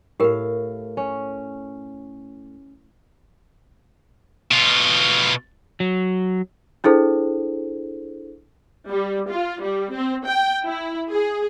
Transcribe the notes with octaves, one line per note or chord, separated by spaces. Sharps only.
A2 G4 A#4 F5
C#4
B2 F4
F#3
D4 E4 G#4 A4 C5
G3
F4
G3
C4
G5
E4
G#4